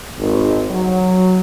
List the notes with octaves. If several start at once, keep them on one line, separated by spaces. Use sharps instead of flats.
G#1
F#3